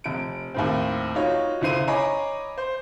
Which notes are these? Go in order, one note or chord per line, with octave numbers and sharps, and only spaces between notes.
F1 D7
D#2 A2 C4
D#4 F4 F#4 C#5
C#2 D3 E4 C5 C7 D#7
C#5 D#5 G#5 A#5 B5 D6
C5